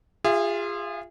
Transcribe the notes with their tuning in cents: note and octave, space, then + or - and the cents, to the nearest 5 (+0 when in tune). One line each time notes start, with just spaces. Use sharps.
F4 +0 G#4 -30 E5 +30